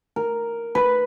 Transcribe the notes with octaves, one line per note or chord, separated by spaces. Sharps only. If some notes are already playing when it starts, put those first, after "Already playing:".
A#4
B4